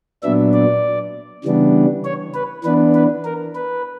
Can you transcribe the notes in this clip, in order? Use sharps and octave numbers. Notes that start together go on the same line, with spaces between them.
A#2 F#3 B3 D4 E5
D5
C#3 E3 G3 B3 D4
C#5
B4
E3 B3 D4 B4
B4
A#4
B4